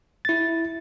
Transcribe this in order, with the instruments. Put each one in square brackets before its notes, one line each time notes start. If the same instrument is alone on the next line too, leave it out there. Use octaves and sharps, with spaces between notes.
[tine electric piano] E4 A6